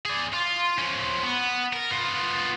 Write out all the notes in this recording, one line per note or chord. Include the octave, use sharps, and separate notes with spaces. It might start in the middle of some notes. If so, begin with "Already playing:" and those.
G#4 D5
F4
F3 C#4
B3
A#4
B3 F4